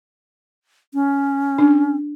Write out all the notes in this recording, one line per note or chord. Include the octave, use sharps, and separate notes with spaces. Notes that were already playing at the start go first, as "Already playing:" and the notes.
C#4
D4